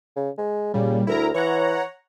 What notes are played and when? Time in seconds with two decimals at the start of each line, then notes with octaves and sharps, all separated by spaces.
0.16 C#3
0.38 G#3
0.74 A#2 C#3 G3
1.07 D2 E4 A#4 A#5
1.34 E3 C#5 F#5 A#5